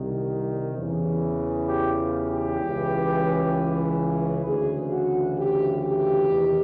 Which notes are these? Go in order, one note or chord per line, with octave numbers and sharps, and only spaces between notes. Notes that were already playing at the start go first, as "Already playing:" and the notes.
Already playing: C2 C3 D#3
E2 C#3 E3
G4
F4
G4
C#2 C#3 E3
D2 C#3 E3 G#4
F#4
G4
G4
E2 C3 D#3